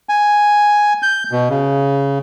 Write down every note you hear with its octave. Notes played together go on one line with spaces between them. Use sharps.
G#5
G6
B2
C#3